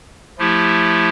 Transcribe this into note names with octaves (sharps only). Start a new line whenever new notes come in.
F3 A3 E4 G4